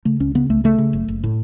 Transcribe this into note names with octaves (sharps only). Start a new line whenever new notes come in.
C#3 A3
C#2 C#4
C#3 B3
C#2 A3
C#3 A3
C#3
F#1
F#1
A2